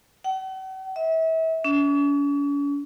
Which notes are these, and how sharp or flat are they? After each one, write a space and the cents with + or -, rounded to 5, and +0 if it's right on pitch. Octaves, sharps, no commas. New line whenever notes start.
F#5 +45
E5 -35
C#4 +45